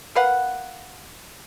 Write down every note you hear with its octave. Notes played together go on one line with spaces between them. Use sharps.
A#4 B4 F5 F#5